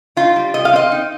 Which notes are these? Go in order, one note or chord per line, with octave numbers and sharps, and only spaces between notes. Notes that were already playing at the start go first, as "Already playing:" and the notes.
D#4 F4
G3
C3 D#5
F5
C4 D#5
D#4